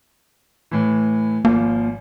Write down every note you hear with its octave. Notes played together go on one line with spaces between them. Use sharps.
A2 E3
G#1 F3 A#3